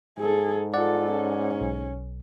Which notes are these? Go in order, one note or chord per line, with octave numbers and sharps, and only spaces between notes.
G#2 G#4 A4
F4 A4 D5 F#5
C#4
B1